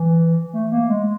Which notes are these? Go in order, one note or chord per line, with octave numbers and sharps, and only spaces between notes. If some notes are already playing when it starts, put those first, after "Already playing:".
Already playing: E3
A3
A#3
G#3